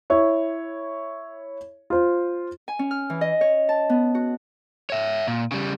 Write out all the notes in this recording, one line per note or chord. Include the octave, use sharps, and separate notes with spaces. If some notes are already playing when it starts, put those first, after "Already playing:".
E4 C#5
F4 C5
G#5
C#4
F6
E3
D#5
C#5
A5
B3
F#4
C#5 E5
A#2
C#3 G3